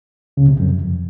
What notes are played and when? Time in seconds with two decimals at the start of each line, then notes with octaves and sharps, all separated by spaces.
0.37 C#2 C#3
0.48 C2 C3
0.60 F#2
0.70 F2
0.82 F2